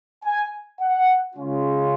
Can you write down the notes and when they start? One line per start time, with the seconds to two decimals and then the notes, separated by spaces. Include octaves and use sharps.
0.24 G#5
0.81 F#5
1.35 C#3 G#3 C#4 F4